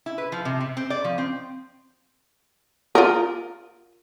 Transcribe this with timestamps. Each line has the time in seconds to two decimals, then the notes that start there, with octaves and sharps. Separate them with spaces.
0.06 E4
0.18 B4
0.32 F3
0.45 C3
0.60 C3
0.77 C4
0.90 D5
1.04 F3
1.18 C4
2.95 F4 A#4